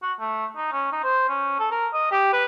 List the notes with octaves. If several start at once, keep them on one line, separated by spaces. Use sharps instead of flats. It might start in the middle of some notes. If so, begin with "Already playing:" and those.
F#4
A3
D#4
C#4
D#4
C5
C#4
A4
A#4
D#5
G4
B4